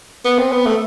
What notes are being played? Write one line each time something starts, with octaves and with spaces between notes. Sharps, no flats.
B3
C4
B3
A3